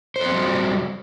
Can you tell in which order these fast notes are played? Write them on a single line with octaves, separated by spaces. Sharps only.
C5 A4 C4 F#3 G3